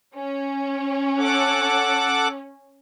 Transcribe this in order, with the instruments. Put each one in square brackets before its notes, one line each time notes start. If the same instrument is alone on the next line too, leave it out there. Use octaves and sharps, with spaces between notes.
[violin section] C#4
[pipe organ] A4 F#5 D6